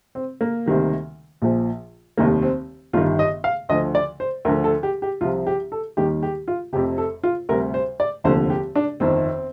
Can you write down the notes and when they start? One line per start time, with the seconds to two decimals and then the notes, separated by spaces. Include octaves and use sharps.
0.15 C4
0.41 A#3
0.66 D2 C3 D#3 G3
1.42 A#1 A#2 F3
2.18 F1 D#2 D#3 G3 A#3
2.42 C4
2.93 G1 G2 D#3 F4
3.19 D#5
3.44 F5
3.69 D2 D3 F3 D#5
3.95 D5
4.20 C5
4.45 D2 A#4
4.48 D3 F3
4.64 A4
4.83 G4
5.02 G4
5.21 C2 C3 F3 F4
5.47 G4
5.72 A4
5.97 D#2 D#3 G3 G4
6.23 G4
6.48 F4
6.73 F1 F2 C3 G4
6.98 A4
7.23 F4
7.49 D2 C3 G3 A#4
7.74 C5
8.00 D5
8.24 F1 D#2 D3 F3 C5
8.50 G4
8.76 D4
9.00 G1 F2 D#3 C4